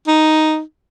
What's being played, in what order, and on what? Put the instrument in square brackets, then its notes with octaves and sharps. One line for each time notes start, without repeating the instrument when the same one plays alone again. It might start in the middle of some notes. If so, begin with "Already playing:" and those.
[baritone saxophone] D#4